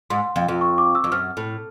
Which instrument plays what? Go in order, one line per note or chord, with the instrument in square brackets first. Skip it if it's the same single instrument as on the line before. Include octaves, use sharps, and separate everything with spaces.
[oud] G#2 [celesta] C6
[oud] F2
F2
[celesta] C#6
D6
E6
[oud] F2
[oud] F#2 [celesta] F6
[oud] A2